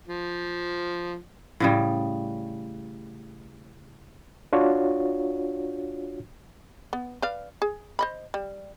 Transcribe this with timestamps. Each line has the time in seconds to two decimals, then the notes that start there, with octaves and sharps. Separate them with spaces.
0.07 F3
1.60 A2 C#3 G3
4.53 D4 F4 F#4 C#5
6.93 B3
7.22 B4 D5 F5
7.62 G#4
7.99 C5 D#5 B5
8.34 G3